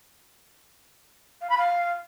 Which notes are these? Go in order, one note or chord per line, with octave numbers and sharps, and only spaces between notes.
F5
B5
F5